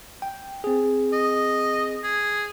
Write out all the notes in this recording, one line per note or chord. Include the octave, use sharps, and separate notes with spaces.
G5
C4 G#4
D#5
G#4